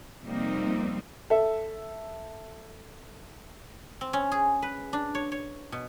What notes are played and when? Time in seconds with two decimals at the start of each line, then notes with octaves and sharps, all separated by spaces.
0.23 F2 C3 G3 A#3 C4 D#4
1.30 A4 E5
4.01 C4
4.13 C#4
4.32 G#4
4.62 B4
4.93 D4
5.15 C#5
5.32 C#5
5.72 B2